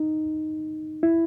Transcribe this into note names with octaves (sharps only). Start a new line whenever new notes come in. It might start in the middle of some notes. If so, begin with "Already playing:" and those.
Already playing: D#4
E4